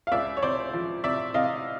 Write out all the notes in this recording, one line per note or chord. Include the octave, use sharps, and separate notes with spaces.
F5
C#2 D5 E5
C#5
C3 C5 D5
F3
C3 D5 E5
C3 D#5 F5